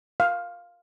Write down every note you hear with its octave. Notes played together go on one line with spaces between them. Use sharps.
F5